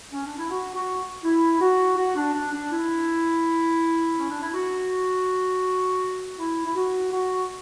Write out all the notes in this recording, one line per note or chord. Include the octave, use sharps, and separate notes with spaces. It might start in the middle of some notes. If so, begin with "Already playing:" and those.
C#4
D4
E4
F#4
F#4
E4
F#4
F#4
D4
D4
D4
E4
C#4
D4
E4
F#4
E4
E4
F#4
F#4